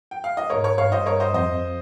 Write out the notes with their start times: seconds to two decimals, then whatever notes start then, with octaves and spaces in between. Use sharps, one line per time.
0.11 G5
0.24 F5
0.37 D#5
0.50 G#2 A#4 C#5
0.64 A#4 C#5
0.78 G2 C#5 F5
0.92 C5 D#5
1.06 A#4 C#5
1.20 C5 D#5
1.34 F2 C5 D#5